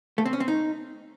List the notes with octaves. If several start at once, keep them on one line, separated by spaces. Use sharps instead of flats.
A3
C4
C#4
C4
D#4